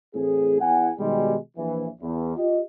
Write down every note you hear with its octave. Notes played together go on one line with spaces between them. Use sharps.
A2 E3 A3 C4 G#4
E2 F#5 G#5
B2 D#3 G3 G#3
A#1 E3
E2
F4 G4 D#5